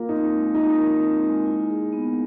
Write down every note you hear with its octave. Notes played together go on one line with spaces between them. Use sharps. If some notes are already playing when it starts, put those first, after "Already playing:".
Already playing: A#3 F4 A#4
C4 D#4
G#3
D#4 F4
A#4
C4
G#3
E4
G#4
B3